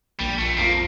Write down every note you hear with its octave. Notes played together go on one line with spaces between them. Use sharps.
A#1 A#2 G3
A3
F2 F3 A#3